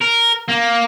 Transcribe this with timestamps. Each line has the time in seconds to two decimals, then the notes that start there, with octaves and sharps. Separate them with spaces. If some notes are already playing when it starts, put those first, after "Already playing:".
0.02 A#4
0.49 A#3